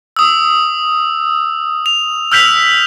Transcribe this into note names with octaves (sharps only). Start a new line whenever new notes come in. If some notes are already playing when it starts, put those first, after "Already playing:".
D#6 E6
F7
E6 F6 G6 B6 F7